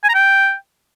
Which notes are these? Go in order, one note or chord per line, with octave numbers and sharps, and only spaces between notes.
G#5
A#5
G5